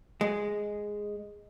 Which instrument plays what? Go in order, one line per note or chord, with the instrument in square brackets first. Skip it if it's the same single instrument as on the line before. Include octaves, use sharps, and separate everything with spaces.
[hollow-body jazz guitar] G#3